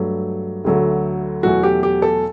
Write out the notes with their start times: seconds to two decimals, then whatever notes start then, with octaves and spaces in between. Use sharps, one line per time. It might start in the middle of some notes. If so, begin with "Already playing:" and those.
Already playing: G2 F#3 A3
0.65 D2 D3 F#3 A3
1.43 E2 B2 F#3 A3 F#4
1.63 G4
1.83 G4
2.02 A4